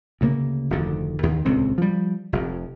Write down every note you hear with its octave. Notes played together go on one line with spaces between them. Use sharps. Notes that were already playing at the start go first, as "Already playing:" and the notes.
D2 C#3 A#3
F1 D2 D3 D#3
D#2 D#3
D#1 C#2 C3 C4
F3 G3
F1 F2